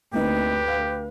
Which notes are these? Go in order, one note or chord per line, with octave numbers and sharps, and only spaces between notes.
D2 A#3 C4 D#4 G4 B4
F5